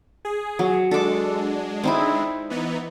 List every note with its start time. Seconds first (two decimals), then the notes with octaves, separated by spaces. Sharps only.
0.25 G#4
0.59 F#3
0.91 G#3 D4 A4 D6
1.84 C4 D#4 E4
2.50 E3 B3 D#4